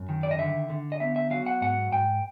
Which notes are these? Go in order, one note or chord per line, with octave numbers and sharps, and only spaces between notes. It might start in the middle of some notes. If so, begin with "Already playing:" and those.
Already playing: F#2
D#3
D5
D#5
D3 E5
D3
D#5
B3 E5
E5
F#3 F5
F#5
G#2 F#5
G#2 G5